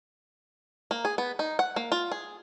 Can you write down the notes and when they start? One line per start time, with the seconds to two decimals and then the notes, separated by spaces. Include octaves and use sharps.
0.91 A#3
1.05 G#4
1.18 B3
1.39 D#4
1.59 F#5
1.76 A#3
1.92 F4
2.12 G#4